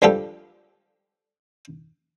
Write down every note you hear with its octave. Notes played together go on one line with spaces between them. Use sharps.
D3 F3 G3 F4 G4 A4